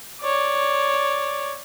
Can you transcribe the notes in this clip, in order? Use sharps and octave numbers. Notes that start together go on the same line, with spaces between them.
C#5 D5